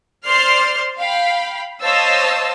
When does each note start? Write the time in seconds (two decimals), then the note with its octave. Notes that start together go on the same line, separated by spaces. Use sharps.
0.25 C5 D5 C6 F6 C7
0.99 F5 G5 B5
1.81 C5 C#5 D#5 F5 A5 E6